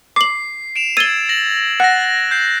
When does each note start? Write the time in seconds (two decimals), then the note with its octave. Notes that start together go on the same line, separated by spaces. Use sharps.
0.16 D6 C7 F#7
0.76 D7 E7 F7
0.97 E6 G#6 A6 D#7 G7
1.29 A#6 F#7
1.80 F#5 F#6 A#6
2.31 G6 C7